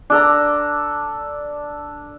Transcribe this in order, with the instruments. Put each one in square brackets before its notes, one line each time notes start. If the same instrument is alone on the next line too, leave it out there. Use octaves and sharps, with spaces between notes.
[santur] D4 A4 A#5